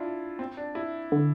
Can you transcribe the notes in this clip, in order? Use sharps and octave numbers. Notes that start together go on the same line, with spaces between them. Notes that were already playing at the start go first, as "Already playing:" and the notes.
Already playing: D4 E4 F4
C4
D4
E4
D3